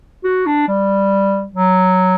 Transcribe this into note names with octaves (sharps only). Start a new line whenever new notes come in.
F#4
D4
G3
F#3